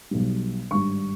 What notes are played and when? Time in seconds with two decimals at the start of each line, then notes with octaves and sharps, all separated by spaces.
0.11 B1 B2 G3
0.71 G#1 G2 G3 C#6